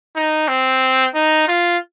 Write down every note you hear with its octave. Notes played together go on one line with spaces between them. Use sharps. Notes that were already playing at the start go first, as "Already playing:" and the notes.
D#4
C4
D#4
F4